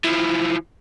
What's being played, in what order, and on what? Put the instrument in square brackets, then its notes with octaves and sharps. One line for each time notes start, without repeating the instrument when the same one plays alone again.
[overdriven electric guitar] E3 F3